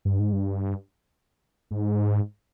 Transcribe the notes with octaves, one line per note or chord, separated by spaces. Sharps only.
G2
G#2
G2
G#2